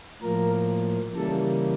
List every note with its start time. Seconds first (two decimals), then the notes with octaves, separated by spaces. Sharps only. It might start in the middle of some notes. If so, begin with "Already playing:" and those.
0.22 A2 F3 A#3 A#4
1.16 C#3 E3 G3 A#3 A4